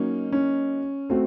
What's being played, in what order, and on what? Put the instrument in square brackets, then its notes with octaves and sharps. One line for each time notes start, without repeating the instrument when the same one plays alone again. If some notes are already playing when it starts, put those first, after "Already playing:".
Already playing: [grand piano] F#3 A#3 D#4 [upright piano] C#4
[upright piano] C#4
[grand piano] A3 C4 F#4